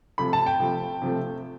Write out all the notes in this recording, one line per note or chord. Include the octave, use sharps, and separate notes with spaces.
C3 F3 A3 B5
A5
G5
C3 F3 A3
C3 F3 A3